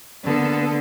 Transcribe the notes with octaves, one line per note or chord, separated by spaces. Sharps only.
D3 A#3 B3 A4